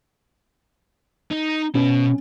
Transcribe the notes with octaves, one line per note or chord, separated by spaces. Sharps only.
D#4
B2 C#4 B4